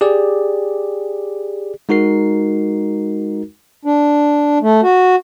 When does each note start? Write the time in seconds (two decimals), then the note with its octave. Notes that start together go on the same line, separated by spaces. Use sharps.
0.01 G4 G#4 D5
1.89 G#3 D#4 F#4 A#4 C7
3.85 D4
4.62 A3
4.83 F#4